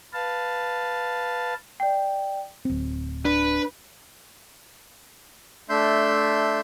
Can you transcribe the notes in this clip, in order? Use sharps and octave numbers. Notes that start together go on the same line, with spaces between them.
B4 F5 A5
D5 G5
D1 C4
D4 B4
A3 D4 E5 C6 G6